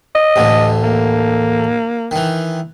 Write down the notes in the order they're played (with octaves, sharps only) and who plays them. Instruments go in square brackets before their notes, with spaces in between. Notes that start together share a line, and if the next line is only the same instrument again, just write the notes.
[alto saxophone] D#5
[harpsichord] A1 D2 D3
[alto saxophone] A#3
[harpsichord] D#3 E3